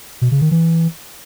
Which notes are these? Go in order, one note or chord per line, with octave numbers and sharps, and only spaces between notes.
B2
C#3
D#3
E3